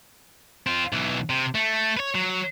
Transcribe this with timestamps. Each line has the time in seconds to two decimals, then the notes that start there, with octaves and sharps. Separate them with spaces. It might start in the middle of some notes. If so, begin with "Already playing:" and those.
0.67 C4 F4
0.93 B1 E3
1.30 C3
1.55 A3
1.97 B4 C#5
2.15 F#3